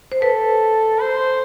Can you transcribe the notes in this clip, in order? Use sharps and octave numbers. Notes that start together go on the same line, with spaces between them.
C5
A4 B4
C5